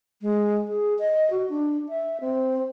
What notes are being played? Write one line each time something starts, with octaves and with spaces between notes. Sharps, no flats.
G#3
G#4
D#5
F#4
D4
E5
C4